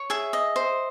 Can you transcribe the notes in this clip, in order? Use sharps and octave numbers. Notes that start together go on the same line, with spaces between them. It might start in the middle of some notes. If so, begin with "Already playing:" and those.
Already playing: C#5
G#4 E5
D#5
C5